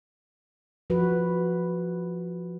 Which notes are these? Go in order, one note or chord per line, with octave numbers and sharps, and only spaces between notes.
F3 F#4 B4